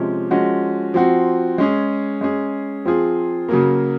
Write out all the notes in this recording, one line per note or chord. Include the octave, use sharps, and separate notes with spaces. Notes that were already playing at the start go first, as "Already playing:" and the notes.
Already playing: C3 F3 G#3 C#4
F3 G#3 C#4 F#4
F3 C4 F#4
G#3 C#4 G#4
G#3 C#4 G#4
F3 C4 F4 G#4
C#3 F#3 A#3